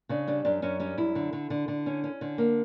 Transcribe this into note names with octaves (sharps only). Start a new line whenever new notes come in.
C#3 D4
G3 D4
F#2 D4
F#2 C#4
G3 C#4
F#2 E4
D3
D3
D3
D3
C#4
C#4
D3
A#3